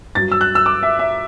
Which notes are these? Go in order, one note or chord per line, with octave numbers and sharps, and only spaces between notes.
G2 F#3 A6
E6
F#6
E6
D6
E5
E5